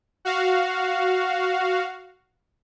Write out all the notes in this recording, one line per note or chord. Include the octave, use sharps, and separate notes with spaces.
F#4 F5